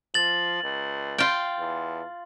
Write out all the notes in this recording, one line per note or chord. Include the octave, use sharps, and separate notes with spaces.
F3 A6 F#7
C#2
F4 G5
E2